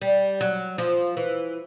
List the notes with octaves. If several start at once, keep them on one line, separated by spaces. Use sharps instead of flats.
G3
F#3
F3
E3